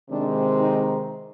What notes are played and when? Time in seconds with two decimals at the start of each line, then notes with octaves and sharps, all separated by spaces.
0.10 C3 D#3 G#3 C4 D4
0.60 D#4